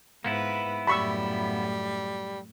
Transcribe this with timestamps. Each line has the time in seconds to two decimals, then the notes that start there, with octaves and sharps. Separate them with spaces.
0.24 G#2 A#3 B3 E4 B4
0.87 F#2 A2 G3 B5 C#6 E6